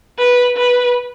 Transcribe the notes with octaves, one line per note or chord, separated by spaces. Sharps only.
B4
B4